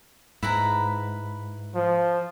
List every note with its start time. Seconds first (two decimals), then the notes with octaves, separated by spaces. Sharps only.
0.43 G#2 E4 B4 A#5
1.75 F3